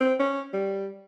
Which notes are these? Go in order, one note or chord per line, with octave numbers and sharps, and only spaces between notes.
C4
C#4
G3